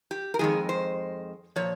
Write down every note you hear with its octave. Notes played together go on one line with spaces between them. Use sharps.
G4
A#4
F2 D#3 G#3 G#4
C5
A#2 F3 C#5